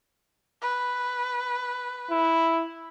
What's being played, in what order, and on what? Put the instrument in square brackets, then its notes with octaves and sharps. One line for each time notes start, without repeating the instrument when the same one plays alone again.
[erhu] B4
[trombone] E4